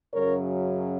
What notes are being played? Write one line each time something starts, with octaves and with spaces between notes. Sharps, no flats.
F#2 C#3 F#3 A#4 C#5